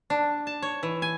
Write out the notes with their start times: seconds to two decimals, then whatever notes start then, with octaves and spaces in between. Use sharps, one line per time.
0.10 D4
0.47 A5
0.62 C#5
0.83 E3
1.02 G#5